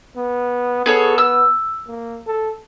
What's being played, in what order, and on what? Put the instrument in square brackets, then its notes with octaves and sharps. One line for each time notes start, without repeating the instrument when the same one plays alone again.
[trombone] B3
[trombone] B3 [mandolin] G#4 A4 C#5
[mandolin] E6
[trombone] A#3
A4